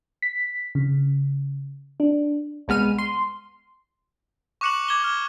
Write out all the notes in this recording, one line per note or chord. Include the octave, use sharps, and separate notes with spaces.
B6
C#3
D4
C2 G#3 B3 F6 D#7
C6
C#6 D6 F#6 C#7 E7 F#7
D6 G#6 E7 G7
D6 F6